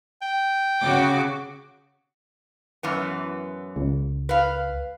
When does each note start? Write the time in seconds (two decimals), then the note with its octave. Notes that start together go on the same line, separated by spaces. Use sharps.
0.22 G5
0.82 C#3 F#4 D6
2.83 F#2 E3 B3
3.76 C#2
4.29 B4 F5